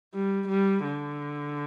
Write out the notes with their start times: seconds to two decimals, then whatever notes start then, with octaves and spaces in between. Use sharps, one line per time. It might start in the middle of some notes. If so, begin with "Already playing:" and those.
0.14 G3
0.49 G3
0.84 D3